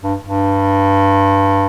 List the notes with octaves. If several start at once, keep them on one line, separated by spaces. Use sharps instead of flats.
G2
G2